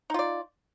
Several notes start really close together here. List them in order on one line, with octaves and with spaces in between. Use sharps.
D#4 F4 D5